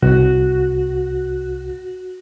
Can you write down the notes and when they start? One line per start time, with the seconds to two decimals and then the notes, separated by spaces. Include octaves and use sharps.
0.02 C2 F#4